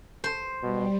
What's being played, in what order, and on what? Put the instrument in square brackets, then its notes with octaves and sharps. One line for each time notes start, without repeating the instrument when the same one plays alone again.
[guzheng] C5
[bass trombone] B2 [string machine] G3